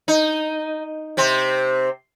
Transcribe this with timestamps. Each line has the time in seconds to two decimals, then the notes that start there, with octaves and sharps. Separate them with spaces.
0.08 D#4
1.17 C3 C4